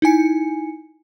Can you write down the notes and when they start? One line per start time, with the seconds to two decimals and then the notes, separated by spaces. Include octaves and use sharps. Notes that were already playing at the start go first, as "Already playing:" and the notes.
0.02 D#4 E4 G#5 C#7